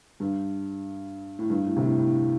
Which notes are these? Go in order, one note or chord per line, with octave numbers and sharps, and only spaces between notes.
G2
A2
G2
A2
C3
A2
A2